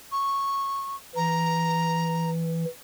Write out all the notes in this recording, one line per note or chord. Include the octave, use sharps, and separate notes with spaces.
C#6
E3 A#5